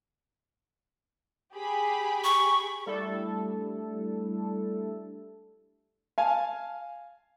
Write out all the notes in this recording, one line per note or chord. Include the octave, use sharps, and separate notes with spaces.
G4 G#4 B5
C#6
G3 A3 D4 E4 A4
F5 G#5 A5